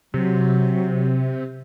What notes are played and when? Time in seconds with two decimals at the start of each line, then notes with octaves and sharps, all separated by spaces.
0.14 C3 F#3